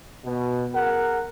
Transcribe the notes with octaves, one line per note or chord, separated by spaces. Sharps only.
B2
G#4 A#4 F#5